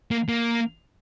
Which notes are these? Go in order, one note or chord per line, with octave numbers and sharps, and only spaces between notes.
A#3
A#3